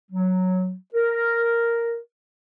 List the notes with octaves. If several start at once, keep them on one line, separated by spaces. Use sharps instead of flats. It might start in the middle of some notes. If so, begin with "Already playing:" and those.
F#3
A#4